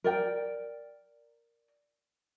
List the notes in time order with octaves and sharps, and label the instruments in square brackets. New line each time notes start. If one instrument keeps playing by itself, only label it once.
[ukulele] A#4 D5 G5